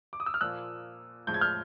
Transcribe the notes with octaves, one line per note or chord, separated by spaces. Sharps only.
D6
D#6
E6
F6
A#2 F3 A#3 E6 F#6
A2 F3 G#3 G6
G#6
F6 G6